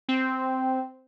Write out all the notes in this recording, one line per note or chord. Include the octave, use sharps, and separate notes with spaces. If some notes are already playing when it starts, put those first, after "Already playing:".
C4